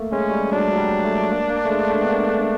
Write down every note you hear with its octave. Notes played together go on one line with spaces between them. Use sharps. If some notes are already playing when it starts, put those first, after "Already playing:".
Already playing: A3 A#3
G#3 C#4
G3
F#3 D4
F#3
G3
A3
A#3
A#3
A3
G#3
A3
B3
A#3
A3